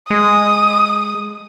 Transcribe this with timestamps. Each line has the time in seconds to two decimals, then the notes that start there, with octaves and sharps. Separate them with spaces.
0.10 G#3 D#6